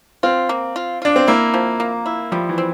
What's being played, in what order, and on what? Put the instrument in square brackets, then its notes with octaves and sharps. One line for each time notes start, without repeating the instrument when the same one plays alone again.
[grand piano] C4 [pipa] F4
[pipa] A#3
F4
[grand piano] D4 [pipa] F4
[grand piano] C4
[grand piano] A#3 [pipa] E4
[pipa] F3
A#3
E4
[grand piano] F3 [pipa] G3
[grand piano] E3
[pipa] C4